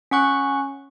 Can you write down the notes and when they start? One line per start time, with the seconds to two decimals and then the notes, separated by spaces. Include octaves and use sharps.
0.11 C#4 F#5 C#6 F#6